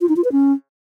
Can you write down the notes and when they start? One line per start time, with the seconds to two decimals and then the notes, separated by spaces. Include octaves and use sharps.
0.01 F4
0.09 D#4
0.17 F4
0.24 B4
0.32 C#4